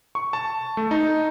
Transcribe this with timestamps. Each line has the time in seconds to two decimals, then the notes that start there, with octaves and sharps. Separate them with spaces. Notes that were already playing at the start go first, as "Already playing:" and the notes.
0.15 C#6
0.33 A5
0.77 A3
0.91 D#4